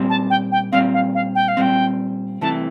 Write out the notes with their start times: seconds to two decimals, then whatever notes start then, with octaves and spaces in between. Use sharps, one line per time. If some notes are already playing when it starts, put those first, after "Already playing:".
Already playing: A#2 G3 C4
0.10 A5
0.30 G5
0.52 G5
0.72 A#2 G3 C4 F5
0.94 F5
1.15 F5
1.35 G5
1.48 F5
1.57 A#2 G3 C4 G5
2.41 C2 C3 E3 A3 A5